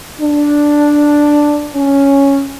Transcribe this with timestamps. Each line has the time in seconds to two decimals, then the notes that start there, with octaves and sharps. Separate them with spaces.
0.20 D4
1.75 C#4